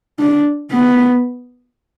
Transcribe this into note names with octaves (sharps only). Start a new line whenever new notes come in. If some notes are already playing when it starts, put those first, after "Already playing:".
D4
B3